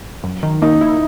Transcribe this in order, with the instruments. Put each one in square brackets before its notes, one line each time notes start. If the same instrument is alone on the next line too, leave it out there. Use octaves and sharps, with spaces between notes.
[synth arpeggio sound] F#2
D#3
[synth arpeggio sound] A#3 [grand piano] D#4
[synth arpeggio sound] E4